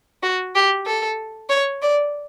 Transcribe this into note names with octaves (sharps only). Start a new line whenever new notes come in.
F#4
G4
A4
C#5
D5